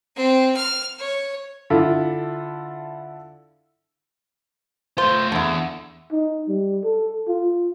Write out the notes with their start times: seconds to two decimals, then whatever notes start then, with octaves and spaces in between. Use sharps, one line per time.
0.16 C4
0.57 F6
1.00 C#5
1.70 D3 E4 F4 A4
4.98 A3 F4 C5
5.32 E2 D3 E4
6.12 D#4
6.48 G3
6.84 A4
7.28 F4